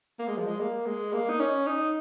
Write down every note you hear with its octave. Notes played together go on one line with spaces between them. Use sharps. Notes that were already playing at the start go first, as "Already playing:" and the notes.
A#3
G#3
F3
G#3
A#3
G#3
A#3
D#4
C#4
D#4